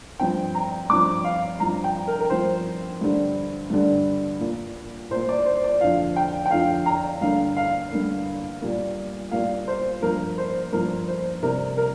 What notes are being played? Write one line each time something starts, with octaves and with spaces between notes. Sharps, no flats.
G2 F3 C4 G5
A#5
G2 F3 C4 D6
F5
G2 F3 C4 A#5
G5
A#4
A#4
G2 F3 C4 C5
G2 D3 G3
G2 D3 G3
A#2 A#3
A#2 A#3 C5
D5
C5
D5
F2 D3 F3 F5
G5
G5
F2 D3 F3 F5
A#5
G2 D3 A#3 F5
F5
G2 D3 A#3
A#2 G3 A#3
A#2 G3 A#3 F5
C5
G2 F3 A#3 A#4
C5
G2 F3 A#3 A#4
C5
C3 G3 C4 A#4
A#4